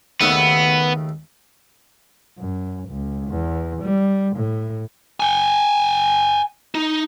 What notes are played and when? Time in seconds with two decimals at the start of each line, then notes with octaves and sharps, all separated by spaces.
0.21 D#2 C#3 A3 B3
2.38 F#2
2.89 C#2
3.28 E2
3.82 G3
4.36 A2
5.20 G5 G#5
6.75 D#4